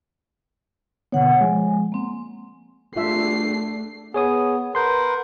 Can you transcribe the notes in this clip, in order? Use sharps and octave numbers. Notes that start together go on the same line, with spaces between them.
B2 D3 B3 C#5 F#5
F3 G#3 G#5
A#3 C4
A3 D4 F4 E5 C7
B3 G#4 C#5 D#6
A#4 B4 F#5 C6 G6